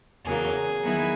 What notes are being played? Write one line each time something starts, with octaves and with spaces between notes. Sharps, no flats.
E2 C#3 F#3 A#3 G#4
D#3 F#3 B3 E4